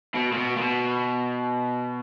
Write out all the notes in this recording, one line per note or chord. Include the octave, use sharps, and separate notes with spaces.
B2
A#2
B2
A#2
B2